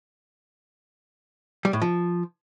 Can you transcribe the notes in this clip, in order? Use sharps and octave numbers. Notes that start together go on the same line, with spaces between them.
G3
A2
F3